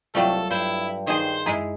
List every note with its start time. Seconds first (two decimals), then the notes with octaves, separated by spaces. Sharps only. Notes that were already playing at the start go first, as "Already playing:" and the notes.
0.15 C2 F#3 G3 A3 F4 A4 F5 G5
0.51 G2 E4 C5
1.07 D#3 D#4 G#4 C5
1.46 F#2 G#3 E4 G#4